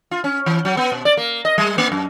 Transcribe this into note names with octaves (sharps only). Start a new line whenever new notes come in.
F4
C#4
E3
F#3
B3
B2
D5
A#3
D#5
G3
A#3
F#2